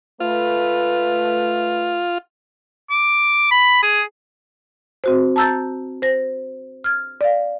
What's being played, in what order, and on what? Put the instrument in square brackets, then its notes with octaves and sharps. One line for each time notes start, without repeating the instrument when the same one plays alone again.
[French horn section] A3 B4 [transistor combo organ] F4
[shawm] D6
B5
G#4
[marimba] C4 F#4 C5
A5 A#5 E6 G6 A6
C5 A#6
F6 G#6
D5 F5